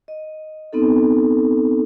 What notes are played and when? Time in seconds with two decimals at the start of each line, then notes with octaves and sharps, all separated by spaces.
0.08 D#5
0.73 B3 C4 D#4 A4